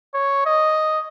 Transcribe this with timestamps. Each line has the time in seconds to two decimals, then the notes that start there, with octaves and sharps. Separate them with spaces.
0.14 C#5
0.46 D#5